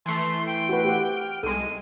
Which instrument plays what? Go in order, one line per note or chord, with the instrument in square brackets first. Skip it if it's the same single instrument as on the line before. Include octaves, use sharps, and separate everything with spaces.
[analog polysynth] E3 A3 [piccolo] C6
[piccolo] G5
[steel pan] F#4 B4
G4 C5 F#5
[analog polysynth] F6
[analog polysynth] C2 G#3 [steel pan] A4 [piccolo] D#7